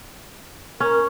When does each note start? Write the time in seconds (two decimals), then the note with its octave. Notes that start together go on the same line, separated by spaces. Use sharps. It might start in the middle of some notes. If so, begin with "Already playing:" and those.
0.80 C#4 A#4